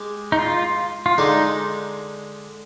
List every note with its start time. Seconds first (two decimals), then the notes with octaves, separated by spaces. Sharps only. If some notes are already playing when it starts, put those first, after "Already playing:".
Already playing: G#3 G4
0.32 D#4
0.39 F4
1.06 F4
1.18 D3 G#3 D4 D#4